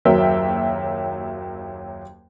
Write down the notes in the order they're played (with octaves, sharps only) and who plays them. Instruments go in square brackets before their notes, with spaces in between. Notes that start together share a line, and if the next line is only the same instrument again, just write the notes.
[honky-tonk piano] F#1 D#2 F#3 A#4 E5 G5